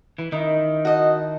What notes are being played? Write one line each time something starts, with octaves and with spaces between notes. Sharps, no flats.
E3 B5
D#3 D#4 E4
F#4 D#5 A5